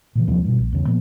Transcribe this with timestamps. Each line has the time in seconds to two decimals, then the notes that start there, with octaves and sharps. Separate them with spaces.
0.15 A#2 C#3 E3
0.27 D#2 C3 F3 F#3
0.44 G2 B2
0.59 A#1
0.72 E2 C#3
0.86 A#2 F3 A#3 B3